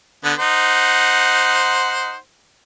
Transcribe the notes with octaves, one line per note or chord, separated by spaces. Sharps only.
D3 B3
D#4 C5 F#5